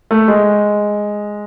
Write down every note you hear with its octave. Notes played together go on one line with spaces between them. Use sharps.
A3
G#3